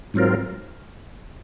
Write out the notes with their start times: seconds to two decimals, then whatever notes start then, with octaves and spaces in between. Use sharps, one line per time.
0.14 G#2 F#3 C4 F4 A#4